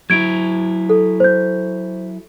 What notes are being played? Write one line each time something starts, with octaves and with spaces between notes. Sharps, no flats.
F#3 E4 G#6 D7
A4
C5 G6